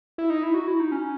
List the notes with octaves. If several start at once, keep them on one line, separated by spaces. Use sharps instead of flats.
E4
D#4
E4
F#4
E4
D#4
C#4